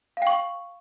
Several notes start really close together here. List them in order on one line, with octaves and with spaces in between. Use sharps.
F5 G5 C#6